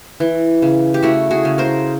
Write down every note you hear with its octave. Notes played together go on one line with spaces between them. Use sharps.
E3
C#3
G4
A3 E4 F#4
F#4 G#4
C#3
A#4 C5